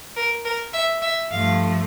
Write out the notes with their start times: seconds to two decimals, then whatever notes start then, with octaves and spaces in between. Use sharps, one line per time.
0.15 A#4
0.44 A#4
0.73 E5
1.01 E5
1.30 G2 F3 A3 F5